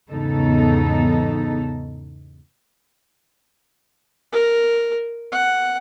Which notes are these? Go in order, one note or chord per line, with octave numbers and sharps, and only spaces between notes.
E2 G#2 C#3 B3 D#4 A4
A#4
F#5